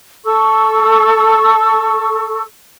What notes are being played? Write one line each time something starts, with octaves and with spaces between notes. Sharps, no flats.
A4 C#6 E6